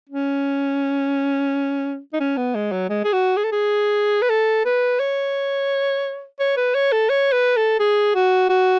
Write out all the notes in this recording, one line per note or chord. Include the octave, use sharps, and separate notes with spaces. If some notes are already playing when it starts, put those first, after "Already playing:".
C#4
D#4
C#4
B3
G#3
F#3
G#3
G#4
F#4
G#4
A4
G#4
B4
A4
B4
C#5
C#5
B4
C#5
A4
C#5
B4
A4
G#4
F#4
F#4